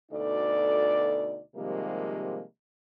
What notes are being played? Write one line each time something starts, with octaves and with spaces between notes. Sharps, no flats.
D2 B2 D#4 A4 D5
C3 D#3 F3 G3 G#3 A#3